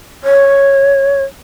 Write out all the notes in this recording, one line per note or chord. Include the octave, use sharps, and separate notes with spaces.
C#5